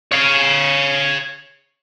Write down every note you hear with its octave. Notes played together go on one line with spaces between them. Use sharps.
C#5 F5